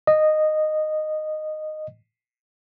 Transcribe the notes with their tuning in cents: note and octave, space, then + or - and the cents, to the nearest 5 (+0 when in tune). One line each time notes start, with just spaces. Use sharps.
D#5 -10